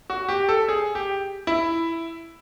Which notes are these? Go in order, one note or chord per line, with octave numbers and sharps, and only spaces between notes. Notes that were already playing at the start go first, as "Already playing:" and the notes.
F#4
G4
A4
G#4
G4
E4